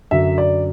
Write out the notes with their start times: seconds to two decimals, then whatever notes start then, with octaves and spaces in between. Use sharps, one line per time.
0.11 F#2 D3 E5
0.38 D5